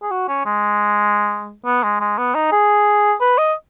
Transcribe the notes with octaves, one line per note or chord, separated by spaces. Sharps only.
G#4
F#4
C#4
G#3
B3
G#3
G#3
B3
D#4
G#4
B4
D#5